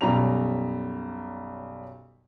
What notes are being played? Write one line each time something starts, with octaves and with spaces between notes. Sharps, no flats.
B1 F#2 G3 A#5 F7